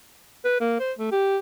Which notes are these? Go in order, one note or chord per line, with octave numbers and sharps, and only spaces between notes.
B4
A#3
C5
A3
G4